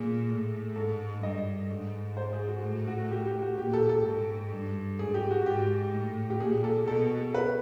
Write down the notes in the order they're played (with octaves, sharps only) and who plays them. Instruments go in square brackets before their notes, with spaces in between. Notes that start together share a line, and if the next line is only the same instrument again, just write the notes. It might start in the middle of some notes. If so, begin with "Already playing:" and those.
Already playing: [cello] A#2 [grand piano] G#4
[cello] A2
[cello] G#2 [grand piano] A4
[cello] G2 [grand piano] D#5
[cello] G#2
[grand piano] C5
G#4
F#4
[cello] A2
[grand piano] F#4
G4
G4
F#4
[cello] A#2 [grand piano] G4
[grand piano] A4
A4
[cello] G#2 [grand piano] A4
[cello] G2
[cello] G#2 [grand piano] G#4
[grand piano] G4
F#4
[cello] G#2 [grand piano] G4
[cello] A2
[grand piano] G4
[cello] A#2 [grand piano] G#4
[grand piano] A4
[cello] B2 [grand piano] A4
[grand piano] B4